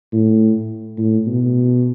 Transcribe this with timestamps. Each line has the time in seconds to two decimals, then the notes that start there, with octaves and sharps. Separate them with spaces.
0.13 A2
0.98 A2
1.27 B2